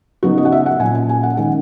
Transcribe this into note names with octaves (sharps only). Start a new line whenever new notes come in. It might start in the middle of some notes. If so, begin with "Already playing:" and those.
C#3 F#3 B3 D#4 F#4
D#5
F#5
E5
F#5
A#2 F#3 C#4 G#5
G#5
G#5
F#5
D#3 G#3 C#4 F#5